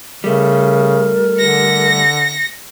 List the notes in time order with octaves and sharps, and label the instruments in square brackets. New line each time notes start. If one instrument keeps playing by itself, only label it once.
[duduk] C#3 [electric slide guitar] G3 A3 [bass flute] A#4
[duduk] D3 [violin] A#6 C#7